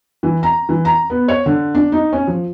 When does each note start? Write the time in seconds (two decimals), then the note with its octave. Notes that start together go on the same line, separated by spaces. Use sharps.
0.23 E3
0.43 A#5
0.69 E3
0.85 A#5
1.10 B3
1.28 C#5
1.46 D3
1.75 D4
1.92 D#4
2.13 C#4
2.27 F3